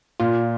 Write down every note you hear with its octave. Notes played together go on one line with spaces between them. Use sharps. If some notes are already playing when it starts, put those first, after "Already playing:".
A#2 F4